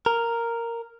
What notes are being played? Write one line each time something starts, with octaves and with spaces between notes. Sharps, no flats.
A#4